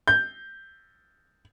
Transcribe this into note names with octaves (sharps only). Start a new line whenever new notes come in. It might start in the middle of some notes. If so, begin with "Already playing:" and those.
G6